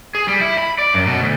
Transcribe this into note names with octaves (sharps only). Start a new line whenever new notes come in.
G#4
G3
E4
B5
D5
F#2
B2
D2